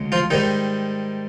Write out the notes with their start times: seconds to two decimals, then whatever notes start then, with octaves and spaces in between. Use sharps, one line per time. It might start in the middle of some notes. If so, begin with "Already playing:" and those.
Already playing: D2 C#3 G#3
0.12 F3 F4
0.30 G#2 D#3 G3 D#4